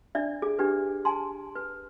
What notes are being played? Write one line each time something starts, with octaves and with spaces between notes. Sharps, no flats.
D4 D5 E5
G#4
D4 G4 B4
G#5 A5 C6
B4